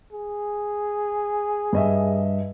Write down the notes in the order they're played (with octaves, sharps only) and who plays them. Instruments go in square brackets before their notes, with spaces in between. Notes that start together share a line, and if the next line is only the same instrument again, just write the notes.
[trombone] G#4
[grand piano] G2 D#5 E5